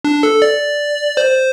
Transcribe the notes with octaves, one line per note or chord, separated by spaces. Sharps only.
D4
A4
D5
C5